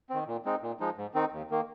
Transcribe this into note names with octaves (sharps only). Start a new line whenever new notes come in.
D#3 C4
A#2
G#3 C4 D#4
A#2
F3 G#3 D#4
G#2
D#3 C4 D#4
D#2
D#3 A#3